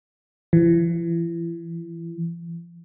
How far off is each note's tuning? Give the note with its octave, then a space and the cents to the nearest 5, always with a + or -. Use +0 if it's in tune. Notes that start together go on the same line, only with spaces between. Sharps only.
E3 +35